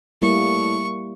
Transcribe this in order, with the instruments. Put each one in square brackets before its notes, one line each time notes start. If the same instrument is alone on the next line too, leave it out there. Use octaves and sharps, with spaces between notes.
[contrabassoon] A2 [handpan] G3 A#3 E4 [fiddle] C#6